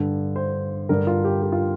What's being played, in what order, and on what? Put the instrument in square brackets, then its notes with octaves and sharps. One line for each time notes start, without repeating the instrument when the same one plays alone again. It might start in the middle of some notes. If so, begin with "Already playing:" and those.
Already playing: [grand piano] G2 D3
C5
G2 D3 A#4
F4
G4
G4
F4